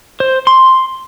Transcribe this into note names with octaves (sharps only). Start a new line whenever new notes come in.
C5
C6